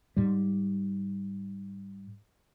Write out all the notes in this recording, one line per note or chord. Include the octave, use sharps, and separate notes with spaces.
G#2 G3